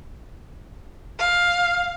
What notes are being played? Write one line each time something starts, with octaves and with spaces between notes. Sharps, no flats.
F5